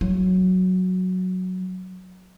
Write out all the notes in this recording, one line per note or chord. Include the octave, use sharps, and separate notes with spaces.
F#3